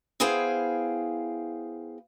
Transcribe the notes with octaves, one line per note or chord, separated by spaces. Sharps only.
B3 E4 G#4 C5 F5 G5